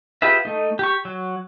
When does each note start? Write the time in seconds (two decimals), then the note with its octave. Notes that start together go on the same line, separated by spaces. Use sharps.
0.22 F4 G4 G#4 B4 E5
0.45 A3 D#4
0.79 G4 C#6
1.05 F#3